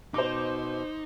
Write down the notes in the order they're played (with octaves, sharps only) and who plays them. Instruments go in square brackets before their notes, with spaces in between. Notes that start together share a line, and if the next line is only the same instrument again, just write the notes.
[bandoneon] B2 [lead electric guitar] D#4 [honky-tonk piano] C5 D6